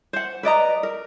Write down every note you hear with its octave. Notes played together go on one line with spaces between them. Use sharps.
C5 F#5
B4 D5 D#5 A#5
A#4